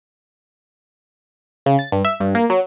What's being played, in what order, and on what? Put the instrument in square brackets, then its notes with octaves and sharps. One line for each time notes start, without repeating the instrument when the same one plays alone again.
[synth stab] C#3
A6
G2
E5
G2
A#3
F#3